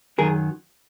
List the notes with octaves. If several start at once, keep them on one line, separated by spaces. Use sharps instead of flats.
F#2 D#3 F#3 G#4 A#4